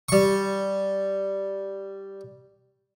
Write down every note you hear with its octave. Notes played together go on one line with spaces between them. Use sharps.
G3 C#6